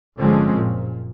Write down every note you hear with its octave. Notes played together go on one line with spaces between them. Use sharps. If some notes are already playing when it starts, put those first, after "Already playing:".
G1 D3 F3 G#3 C4 C#4
F#1 A#2